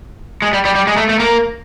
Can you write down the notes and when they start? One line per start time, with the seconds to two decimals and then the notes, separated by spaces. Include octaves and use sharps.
0.42 G#3
0.53 G3
0.65 G3
0.75 G3
0.87 G#3
0.97 A3
1.09 A3
1.20 A#3